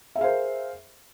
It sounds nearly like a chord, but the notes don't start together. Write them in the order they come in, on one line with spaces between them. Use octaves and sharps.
E5 G#4 F5 C5 A#4